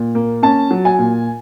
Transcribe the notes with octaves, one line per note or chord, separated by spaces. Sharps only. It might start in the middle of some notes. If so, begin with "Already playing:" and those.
Already playing: A#2
A#3
C#4 A5
F#3
G#5
A#2